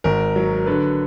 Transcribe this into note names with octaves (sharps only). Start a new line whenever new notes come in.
G#1 A#4
F#3
D3 B4